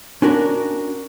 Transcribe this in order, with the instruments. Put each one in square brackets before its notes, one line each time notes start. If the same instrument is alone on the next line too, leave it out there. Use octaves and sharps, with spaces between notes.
[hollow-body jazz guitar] C#4 D4 F#4 A#4